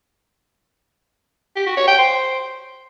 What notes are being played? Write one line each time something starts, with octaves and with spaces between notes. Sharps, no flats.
G4
F#4
C#5
G5
C5